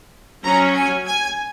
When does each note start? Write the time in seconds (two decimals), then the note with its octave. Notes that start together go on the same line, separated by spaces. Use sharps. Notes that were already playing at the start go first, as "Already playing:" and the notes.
0.44 F#3 C#4 A#5
0.76 G#5
1.07 G#5